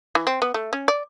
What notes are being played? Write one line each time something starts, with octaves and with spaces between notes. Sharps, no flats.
E3
C4
B3
A3
C#4
D5